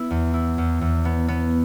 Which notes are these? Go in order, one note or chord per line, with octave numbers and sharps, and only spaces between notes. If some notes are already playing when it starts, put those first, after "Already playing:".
Already playing: B3 E4
E2
E4
E2
E2
B3
B3